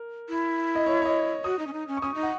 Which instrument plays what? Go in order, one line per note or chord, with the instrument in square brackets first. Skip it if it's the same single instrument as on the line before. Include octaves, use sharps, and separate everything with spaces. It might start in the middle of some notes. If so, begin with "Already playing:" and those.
Already playing: [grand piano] A#4
[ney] E4
[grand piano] D#5
C#5
C#5
D#5
[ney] F#4 [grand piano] D#6
[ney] D#4
C#4
D#4
C#4
[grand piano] C#6
[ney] C#4 [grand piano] D#6
[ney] D#4
[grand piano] F#5